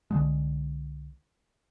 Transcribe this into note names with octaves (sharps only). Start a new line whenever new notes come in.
C2 D3 G#3